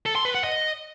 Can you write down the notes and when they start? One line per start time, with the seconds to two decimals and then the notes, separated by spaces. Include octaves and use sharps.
0.06 A4
0.15 C6
0.25 B4
0.35 F#5
0.44 D#5